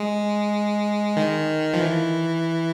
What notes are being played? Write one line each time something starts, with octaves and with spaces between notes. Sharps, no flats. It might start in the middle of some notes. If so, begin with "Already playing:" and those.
Already playing: G#3
D#3
F3
E3